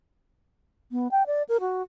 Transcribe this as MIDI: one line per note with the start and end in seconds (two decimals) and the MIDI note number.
0.92 1.08 59
1.12 1.26 79
1.27 1.43 74
1.49 1.57 70
1.60 1.82 66